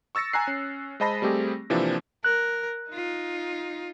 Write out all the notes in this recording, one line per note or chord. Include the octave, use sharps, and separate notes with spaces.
C#6 E6 A6 A#6 C#7
G#5 A#5 F#6 C7
C#4
G#3 C5 D#5 A5 B5 A#6
G3 A3 C4 G4 G#4
C3 E3 F3 A#3 C4 D4
A#4 F#6
D#4 F4